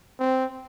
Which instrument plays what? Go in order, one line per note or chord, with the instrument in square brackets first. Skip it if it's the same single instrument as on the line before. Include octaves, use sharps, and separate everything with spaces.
[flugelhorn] C4